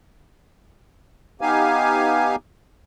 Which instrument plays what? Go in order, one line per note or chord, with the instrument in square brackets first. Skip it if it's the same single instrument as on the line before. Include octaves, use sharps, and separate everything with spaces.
[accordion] B3 D#4 G4 F5 G#5